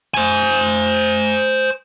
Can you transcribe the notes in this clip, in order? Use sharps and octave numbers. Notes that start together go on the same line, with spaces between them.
C5 G#5